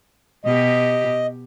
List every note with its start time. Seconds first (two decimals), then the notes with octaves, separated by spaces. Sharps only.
0.45 B2 G4 D#5